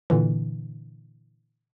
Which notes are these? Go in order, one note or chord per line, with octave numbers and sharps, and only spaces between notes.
A#2 D3 E3